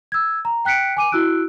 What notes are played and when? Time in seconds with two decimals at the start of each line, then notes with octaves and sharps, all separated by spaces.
0.12 E6 G#6
0.45 A#5
0.65 G5 F#6 B6 C#7 D7
0.97 G#5 D6 D#7
1.12 E4 F#4 E6 F#6 D7